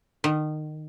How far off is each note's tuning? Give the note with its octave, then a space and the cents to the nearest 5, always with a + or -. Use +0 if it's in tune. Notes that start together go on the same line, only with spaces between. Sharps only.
D#3 -25